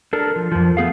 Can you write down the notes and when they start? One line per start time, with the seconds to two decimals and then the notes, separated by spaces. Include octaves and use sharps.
0.13 D4 A4 A#4
0.36 F3
0.52 F2 F3
0.77 A3 B3 G#4 F5